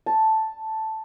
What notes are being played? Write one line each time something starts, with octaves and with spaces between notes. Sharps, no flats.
A5